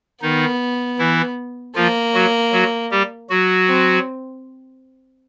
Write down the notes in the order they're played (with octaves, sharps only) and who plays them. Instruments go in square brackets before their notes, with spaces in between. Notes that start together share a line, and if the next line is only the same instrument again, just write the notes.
[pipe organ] D#3 D#4 [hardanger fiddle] B3
[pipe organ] E3 E4
[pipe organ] F3 F4 [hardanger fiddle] A#3
[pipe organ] F#3 F#4
F#3 F#4
G3 G4
F#3 F#4
[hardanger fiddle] C4